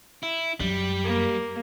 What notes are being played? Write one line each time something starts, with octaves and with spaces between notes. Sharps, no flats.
E4
F#2 G3
A#3